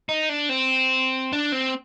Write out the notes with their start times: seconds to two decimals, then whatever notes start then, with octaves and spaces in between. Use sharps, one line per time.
0.09 D#4
0.29 D4
0.49 C4
1.33 D4
1.52 C4